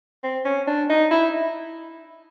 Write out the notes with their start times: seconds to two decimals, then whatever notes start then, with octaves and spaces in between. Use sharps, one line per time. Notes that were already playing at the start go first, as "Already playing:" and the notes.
0.24 C4
0.45 C#4
0.68 D4
0.90 D#4
1.11 E4